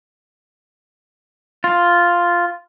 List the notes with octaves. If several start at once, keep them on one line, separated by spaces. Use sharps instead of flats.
F4